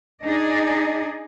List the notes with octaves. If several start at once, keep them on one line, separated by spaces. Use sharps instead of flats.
D4 D#4 G#4 D5 D#5